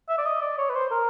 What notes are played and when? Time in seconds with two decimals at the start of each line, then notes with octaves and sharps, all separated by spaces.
0.08 E5
0.18 D5
0.26 D#5
0.41 D5
0.58 C#5
0.69 B4
0.74 C5
0.91 A#4